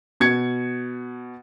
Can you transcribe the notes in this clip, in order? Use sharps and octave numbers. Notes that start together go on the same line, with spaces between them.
B2 G#6 C#7